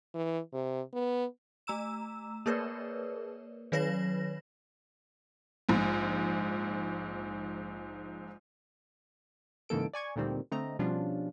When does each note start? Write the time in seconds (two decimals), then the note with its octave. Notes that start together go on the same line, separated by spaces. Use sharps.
0.15 E3
0.53 C3
0.93 B3
1.67 A3 A#5 E6 E7
2.46 A#3 G#4 A#4 B4 C#5 D5
3.72 D#3 F#3 B4 C#5 A#6
5.69 A#1 G#2
9.69 G#2 C#3 E3 A#3 A4 D7
9.94 D5 G#5 C#6 G#6
10.16 D2 A#2 D#3 G3 C4
10.52 D3 A3 C4 D#5 A#5
10.79 B2 F3 G3 C#4 D4 F4